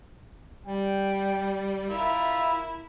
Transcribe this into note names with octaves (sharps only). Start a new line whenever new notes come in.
G3 G5
E4 F4 A#4 E5 B5